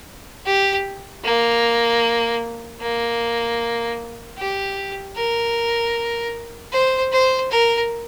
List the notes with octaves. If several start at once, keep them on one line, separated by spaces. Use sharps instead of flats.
G4
A#3
A#3
G4
A#4
C5
C5
A#4